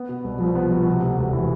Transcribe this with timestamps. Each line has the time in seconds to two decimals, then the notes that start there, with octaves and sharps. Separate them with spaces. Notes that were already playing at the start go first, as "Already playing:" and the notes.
Already playing: B3
0.09 B2
0.24 C2
0.40 C2 F3
0.55 B3
0.71 B2
0.87 C3
1.02 D2
1.18 E1
1.33 E3